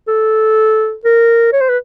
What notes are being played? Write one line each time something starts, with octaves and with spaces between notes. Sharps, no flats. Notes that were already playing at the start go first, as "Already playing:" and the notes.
A4
A#4
C#5
C5
B4